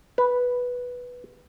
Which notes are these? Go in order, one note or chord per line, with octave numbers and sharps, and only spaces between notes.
B4